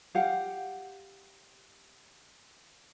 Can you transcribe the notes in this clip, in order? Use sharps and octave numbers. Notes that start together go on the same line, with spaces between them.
G4 F5 F#5